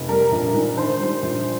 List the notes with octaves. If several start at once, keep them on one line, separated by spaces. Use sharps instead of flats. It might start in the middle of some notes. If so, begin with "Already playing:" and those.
Already playing: F1
G3 A#4
A#1
G#2
D#3 C5
G3
A#1